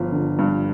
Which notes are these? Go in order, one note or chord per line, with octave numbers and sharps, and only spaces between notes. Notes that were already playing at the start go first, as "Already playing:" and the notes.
Already playing: G1 F3
D3
G2